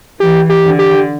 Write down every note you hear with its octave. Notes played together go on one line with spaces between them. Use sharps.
E3 G4
G4
D3
G4